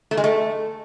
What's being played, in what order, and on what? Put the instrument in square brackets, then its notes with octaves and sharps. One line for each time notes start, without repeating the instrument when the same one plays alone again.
[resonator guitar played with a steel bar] A3
G#3
A3